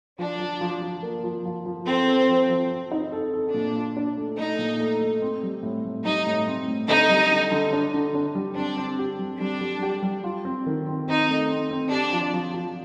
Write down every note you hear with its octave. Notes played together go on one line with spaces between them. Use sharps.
F3 D4
F3
F3
F3
A#3
F3
F3
F3
C4 A4
A4
F3
F3
C4
D#4
A4
A4
A#2 D4
F4
D4
A3
A3 D#4
A#2
A3
A3
C4
G3
A2
A2
G3 D#4
A2
C4
A2
D3 D#4
G3
D3
D3
D4
D3
D4
G3
C4 D4
C4
G4
G3
G3 D4
G3
G4
G3
F4
C4
D#3
C4
C4 D#4
A3
C4
C4
D4 G4
F3
F3
F3